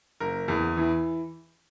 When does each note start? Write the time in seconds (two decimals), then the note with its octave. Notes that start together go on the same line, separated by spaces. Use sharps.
0.20 F#1 A#4
0.48 E2
0.77 E3